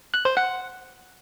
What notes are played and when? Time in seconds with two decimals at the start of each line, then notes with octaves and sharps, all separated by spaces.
0.14 F#6
0.25 C5
0.37 F#5